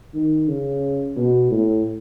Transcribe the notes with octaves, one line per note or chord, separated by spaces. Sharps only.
D#3
C#3
B2
A2